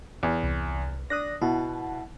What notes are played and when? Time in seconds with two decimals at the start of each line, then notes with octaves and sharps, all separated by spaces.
0.23 E2
0.44 C2
1.10 D4 D#6 F#6 A#6
1.42 B2 E4 F#5 A5